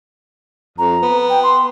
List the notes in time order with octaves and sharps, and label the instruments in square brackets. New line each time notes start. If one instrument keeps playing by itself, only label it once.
[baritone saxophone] F2 [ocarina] A#5
[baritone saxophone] B3
[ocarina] G5
C6